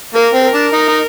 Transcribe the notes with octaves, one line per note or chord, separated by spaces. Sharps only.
A#3 A#4
C4
A#4
D4
D#4
D#4